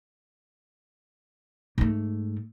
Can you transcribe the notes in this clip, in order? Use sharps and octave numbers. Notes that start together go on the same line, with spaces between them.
G#2 A3